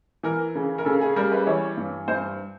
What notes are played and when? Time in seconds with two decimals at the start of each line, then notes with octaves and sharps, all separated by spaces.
0.23 E3 A#4
0.55 C#3
0.78 A#4
0.85 C#3 A4
1.01 G#4
1.16 G3 A#4
1.32 B4
1.47 E3 C#5
1.77 G2
2.08 G2 C5